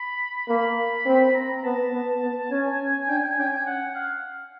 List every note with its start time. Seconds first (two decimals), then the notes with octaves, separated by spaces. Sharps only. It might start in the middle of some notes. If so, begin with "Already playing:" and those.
Already playing: B5
0.48 A#3 B5
1.06 C4
1.35 A#5
1.58 A#5
1.64 B3 A5
1.93 B3
2.21 B3
2.51 C#4 G#5
3.09 D4 G5
3.17 G#5
3.24 G5
3.31 G#5
3.37 C#4 G5
3.47 G#5
3.54 G5
3.66 F#5
3.95 F5